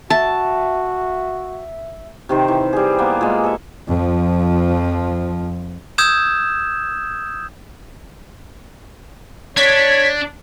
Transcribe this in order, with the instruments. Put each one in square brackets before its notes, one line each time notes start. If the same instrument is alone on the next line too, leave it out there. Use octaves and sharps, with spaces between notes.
[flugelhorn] F#4 [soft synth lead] E5 [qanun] A5
[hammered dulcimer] C3 D#3 C5
E3
G3 G#4
A#3 B3
A#2 G#3
A4 E5
[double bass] F2 F3
[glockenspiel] D#6 E6 G6 G#6 E7
[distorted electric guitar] D4 [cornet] C#5 [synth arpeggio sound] G#6 B6